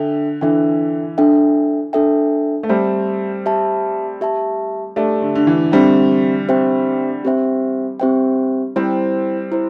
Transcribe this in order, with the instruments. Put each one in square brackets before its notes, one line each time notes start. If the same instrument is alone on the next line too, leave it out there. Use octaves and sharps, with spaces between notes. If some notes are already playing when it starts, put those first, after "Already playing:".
Already playing: [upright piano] D3 [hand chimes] D4 A4 E5 G5
[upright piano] E3 [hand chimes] D4 A4 E5 G5
[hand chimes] D4 A4 E5 G5
D4 A4 E5 G5
[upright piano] A3
[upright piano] G3 C4 [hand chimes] G4 E5 A5
[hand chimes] G4 E5 A5
G4 E5 A5
[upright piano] A3 D4 [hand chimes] G4 E5 A5
[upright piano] D3
D3
E3
[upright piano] D3 G3 [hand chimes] C4 G4 C5 E5 G5
[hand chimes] C4 G4 C5 E5 G5
C4 G4 C5 E5 G5
C4 G4 C5 E5 G5
[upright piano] G3 C4 [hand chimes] E4 C5 G5
[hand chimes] E4 C5